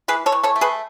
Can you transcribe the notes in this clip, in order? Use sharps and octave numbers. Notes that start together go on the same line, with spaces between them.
E3 G#4 B4
A4 C#5
E3
A4 C#5
A3
G#4 B4